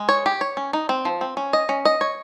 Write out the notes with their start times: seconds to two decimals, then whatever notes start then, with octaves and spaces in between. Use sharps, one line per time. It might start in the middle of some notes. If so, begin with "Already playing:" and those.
Already playing: G#3
0.09 C#5
0.26 G4
0.41 C#5
0.57 C#4
0.73 D#4
0.89 C4
1.05 F3
1.21 C4
1.37 C#4
1.53 D#5
1.69 C#4
1.85 D#5
2.01 C#5